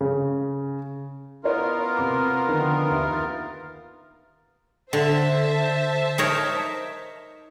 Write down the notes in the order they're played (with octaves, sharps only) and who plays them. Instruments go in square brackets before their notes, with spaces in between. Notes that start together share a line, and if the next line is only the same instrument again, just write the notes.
[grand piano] C#3
[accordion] B3 F4 A#4 [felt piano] E4 C#5 F#5
[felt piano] C3 D6
D3 D#3 F3
D#2 E5
A6
[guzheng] D3 [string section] C5 E5 A5
[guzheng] D#4 A#4 C#5